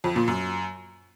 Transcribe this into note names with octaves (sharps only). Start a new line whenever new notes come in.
F2
A#2
F#2